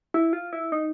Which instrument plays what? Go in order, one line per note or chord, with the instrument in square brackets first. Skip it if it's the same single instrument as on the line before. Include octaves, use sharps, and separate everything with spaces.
[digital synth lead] E4
F4
E4
D#4